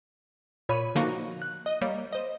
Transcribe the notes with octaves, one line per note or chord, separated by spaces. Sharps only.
A#2 C#5 B5 D#7
D3 F3 A#3 D#4 F#4
F#6
D#5
G3 A#3 C#5
C5 D#5